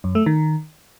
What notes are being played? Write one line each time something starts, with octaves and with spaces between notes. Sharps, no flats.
F#2
A3
D#3